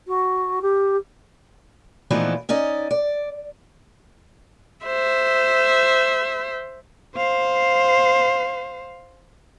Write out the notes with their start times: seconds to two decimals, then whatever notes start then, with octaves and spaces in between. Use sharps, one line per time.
0.07 F#4
0.61 G4
2.10 A#2 E3 F3 A3 B3 D#4
2.49 C#4 D#4 D5 D#5
2.91 D5
4.86 C5 E5
7.16 C5 F5